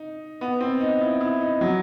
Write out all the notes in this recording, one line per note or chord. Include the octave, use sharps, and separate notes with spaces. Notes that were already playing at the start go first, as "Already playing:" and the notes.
Already playing: D#4
B3
C4
D#4
E4
E4
D#4
F#3